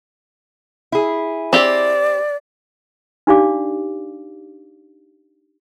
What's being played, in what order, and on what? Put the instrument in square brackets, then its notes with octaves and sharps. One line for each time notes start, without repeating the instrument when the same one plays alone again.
[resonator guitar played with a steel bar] E4 G#4
[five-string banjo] C4 G4 [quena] D5
[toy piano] D4 D#4 G4 D5 F5 D6